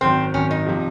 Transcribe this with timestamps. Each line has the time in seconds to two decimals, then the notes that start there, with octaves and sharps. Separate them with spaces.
0.01 G#1 F#2 D#3 C4
0.34 G#1 F#2 D#3 C#4
0.51 D#4
0.66 C3 F3